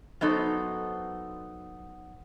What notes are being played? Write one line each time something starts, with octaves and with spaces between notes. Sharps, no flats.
F#3 B3 D#4 A4 C5